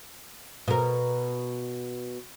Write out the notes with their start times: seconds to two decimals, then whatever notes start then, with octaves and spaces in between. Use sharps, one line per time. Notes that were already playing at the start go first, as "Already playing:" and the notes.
0.68 B2 A#4